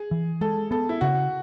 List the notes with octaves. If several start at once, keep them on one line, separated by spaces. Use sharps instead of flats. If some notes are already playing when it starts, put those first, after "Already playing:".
Already playing: G#4
E3
G#3 A4
B3 A4
E4
C#3 F#4